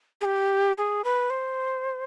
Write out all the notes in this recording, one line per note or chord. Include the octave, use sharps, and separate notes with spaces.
G#4
G4
G#4
B4
C5